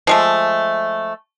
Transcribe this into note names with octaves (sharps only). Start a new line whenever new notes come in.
F3 G#3 A3